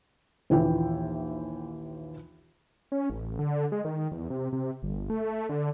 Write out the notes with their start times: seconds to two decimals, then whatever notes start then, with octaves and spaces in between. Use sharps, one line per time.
0.50 A#1 D#2 E3 F4 E5 G5
2.92 C#4
3.10 A1
3.39 D3
3.72 G#3
3.85 D#3
4.12 E2
4.30 C3
4.52 C3
4.82 G1
5.10 A3
5.49 D3